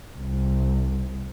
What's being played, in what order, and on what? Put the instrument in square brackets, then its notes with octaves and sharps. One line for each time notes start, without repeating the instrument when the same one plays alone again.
[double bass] C2